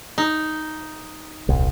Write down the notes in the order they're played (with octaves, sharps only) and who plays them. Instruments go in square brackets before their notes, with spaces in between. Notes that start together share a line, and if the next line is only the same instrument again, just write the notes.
[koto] D#4
[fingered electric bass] D#1 C2